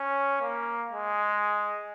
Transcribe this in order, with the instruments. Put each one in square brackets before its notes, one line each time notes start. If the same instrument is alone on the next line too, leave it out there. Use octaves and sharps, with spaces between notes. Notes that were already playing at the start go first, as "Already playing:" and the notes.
Already playing: [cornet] C#4
A#3
G#3